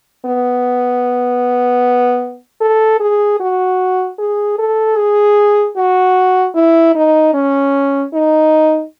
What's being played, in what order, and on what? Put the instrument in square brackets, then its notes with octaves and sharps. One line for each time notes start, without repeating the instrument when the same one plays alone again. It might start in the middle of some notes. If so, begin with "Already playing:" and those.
[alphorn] B3
A4
G#4
F#4
G#4
A4
G#4
F#4
E4
D#4
C#4
D#4